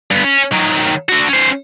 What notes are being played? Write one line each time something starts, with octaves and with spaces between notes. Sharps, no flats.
G2 B3
C#4
D#3 F#3
D3 F#4
C#4 C5